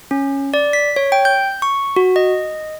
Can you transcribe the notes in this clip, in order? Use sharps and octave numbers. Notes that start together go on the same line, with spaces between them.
C#4
D5
B6
C#5
G5
G6
C#6
F#4
D#5